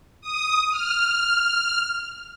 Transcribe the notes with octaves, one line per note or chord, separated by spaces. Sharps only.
D#6
F6